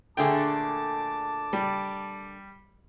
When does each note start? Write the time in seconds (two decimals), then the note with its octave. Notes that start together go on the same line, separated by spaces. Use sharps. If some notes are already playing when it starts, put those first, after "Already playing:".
0.17 A#2 D3 A3 G#4 G5 A5 D6
1.53 G3